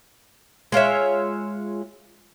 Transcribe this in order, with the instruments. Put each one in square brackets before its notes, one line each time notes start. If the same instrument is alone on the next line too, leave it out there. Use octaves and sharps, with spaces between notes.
[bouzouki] G#3 F4 C#5 E5